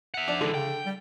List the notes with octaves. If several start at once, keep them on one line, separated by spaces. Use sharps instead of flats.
E5 F#5
F3 D4
D3 E3 G#3
C#3 G5
G3